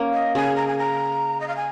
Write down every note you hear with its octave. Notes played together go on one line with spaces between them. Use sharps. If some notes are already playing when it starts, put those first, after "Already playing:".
Already playing: A#3 C#4
D#5
C#3 G#5
A#5
G#5
A#5
D#5
F5
G#5